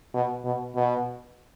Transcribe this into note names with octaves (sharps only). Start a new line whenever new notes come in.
B2
B2
B2